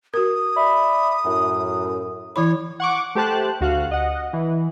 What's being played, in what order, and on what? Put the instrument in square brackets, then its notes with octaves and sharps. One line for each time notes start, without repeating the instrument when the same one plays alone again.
[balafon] F#4 A#4 [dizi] D#6
[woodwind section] D5 E5 B5
F#2 A2
[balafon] E3 E4 B5 [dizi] C#5
[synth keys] F#5 C#6 D6
A3 G4 C5 A5 F#6
D2 F#4 F5 F#6
D#5 F#5
E3